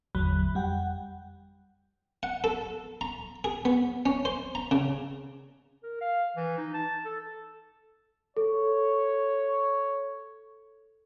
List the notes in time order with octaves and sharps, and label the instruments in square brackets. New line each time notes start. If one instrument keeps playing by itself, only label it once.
[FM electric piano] G#1 E2 D3 F#3 B5 F#6
F2 G3 F#5 G5
[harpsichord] F#5
A4
A#5
G#4
B3
C#4
C5
A#5
C#3
[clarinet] A#4
F5
E3
D#4
A5
A4
[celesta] A4 [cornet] C#5